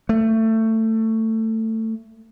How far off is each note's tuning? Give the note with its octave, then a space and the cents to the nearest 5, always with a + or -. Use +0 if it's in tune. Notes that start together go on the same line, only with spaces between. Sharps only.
A3 +20